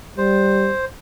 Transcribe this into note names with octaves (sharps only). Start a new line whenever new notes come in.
G3 C5